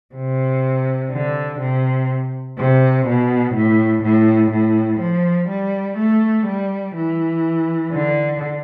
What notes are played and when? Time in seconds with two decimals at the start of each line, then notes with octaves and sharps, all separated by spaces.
0.15 C3
1.11 D3
1.60 C3
2.58 C3
3.07 B2
3.55 A2
4.03 A2
4.52 A2
5.00 F3
5.49 G3
5.98 A3
6.47 G3
6.95 E3
7.92 D3